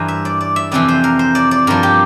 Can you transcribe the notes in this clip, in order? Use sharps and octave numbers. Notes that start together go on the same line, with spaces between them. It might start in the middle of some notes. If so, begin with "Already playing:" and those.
Already playing: G2 E3 A#4 C5
E5
D5
D5
E5
F2 C3 E3 D5
C5
A#4
C5
D5
D5
G2 F3 A#4
G4